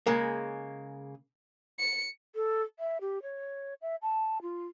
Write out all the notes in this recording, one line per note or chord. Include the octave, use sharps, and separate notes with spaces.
C#3 G#3 A#3
C#7
A4
E5
G4
C#5
E5
A5
F4